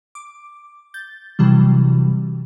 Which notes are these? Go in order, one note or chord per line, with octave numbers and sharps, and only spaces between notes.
D6
G6 A6
C3 E3 F#3 G3